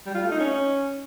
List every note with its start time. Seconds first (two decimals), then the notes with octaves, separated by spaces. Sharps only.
0.06 G3
0.15 F4
0.23 A3
0.31 D#4
0.40 C#4